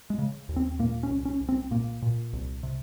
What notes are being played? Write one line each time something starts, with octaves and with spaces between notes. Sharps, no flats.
G#3
C#3
D#2
C4
A#2 A#3
C#4
C2
C#4
C2
C4
A#2 A#3
A#2
C2
C3